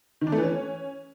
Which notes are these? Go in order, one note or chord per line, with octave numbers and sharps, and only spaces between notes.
D#3
D4
A3
E3
C#4